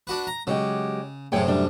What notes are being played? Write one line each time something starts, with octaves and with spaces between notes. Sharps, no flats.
D4 F#4 B4
A#5
C#3 F#3 G#3 G4
F#2 A2 C3 G#4 C#5 G5
G3 D4